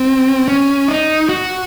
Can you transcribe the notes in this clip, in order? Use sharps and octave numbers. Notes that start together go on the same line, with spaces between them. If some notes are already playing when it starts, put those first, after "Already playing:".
Already playing: C4
C#4
D#4
F#4